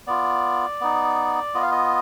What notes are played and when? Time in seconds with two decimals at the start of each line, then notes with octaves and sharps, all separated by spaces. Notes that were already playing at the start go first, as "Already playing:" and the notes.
0.07 B3 F4 D5
0.81 B3 D#4
1.54 B3 F4 D#5
1.62 F5
1.71 D#5